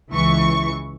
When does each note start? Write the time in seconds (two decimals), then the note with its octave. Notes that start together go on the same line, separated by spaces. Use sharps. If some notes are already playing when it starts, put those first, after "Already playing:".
0.11 C#2 E3 C#6